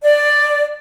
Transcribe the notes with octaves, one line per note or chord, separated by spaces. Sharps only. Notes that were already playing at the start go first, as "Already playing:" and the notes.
D5